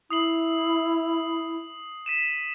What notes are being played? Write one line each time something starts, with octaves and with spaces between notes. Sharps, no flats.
E4 D#6 C7 F#7
B6 D#7 E7